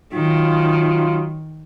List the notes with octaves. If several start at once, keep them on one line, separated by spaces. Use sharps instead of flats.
D#3 F#3 F4